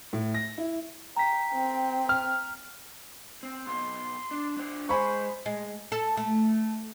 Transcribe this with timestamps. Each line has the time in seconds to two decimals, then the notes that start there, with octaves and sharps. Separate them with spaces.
0.13 A2
0.34 A#6
0.58 E4
1.17 G5 A#5 B6
1.51 C4 G5
2.09 F6
3.43 C4
3.67 B1 B2 C6
4.31 D4
4.57 D4 C5
4.89 G#3 C5 G#5 B5 C#6
5.46 G#3
5.92 A4
6.17 A3